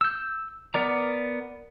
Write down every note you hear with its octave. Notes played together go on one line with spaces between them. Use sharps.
E6 G6
B3 A#4 D5 A#5